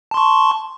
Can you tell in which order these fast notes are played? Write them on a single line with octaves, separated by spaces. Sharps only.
A5 C6 C#6